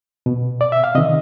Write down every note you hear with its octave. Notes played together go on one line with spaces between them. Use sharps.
B2
D5
E5
F5
C3 D#3 D#5